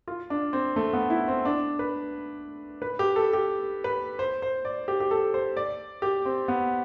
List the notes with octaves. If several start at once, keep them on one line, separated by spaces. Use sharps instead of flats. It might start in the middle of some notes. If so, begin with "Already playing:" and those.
F4
D4
C4
A3
B3
E4
C4
D4
B4
B4
G4
A4
G4
B4
C5
C5
D5
G4
G4
A4
C5
D5
G4
C4
B3